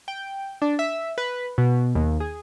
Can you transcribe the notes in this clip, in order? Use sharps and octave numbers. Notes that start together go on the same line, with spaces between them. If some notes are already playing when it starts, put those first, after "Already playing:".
G5
D4
E5
B4
B2
D#2
G#4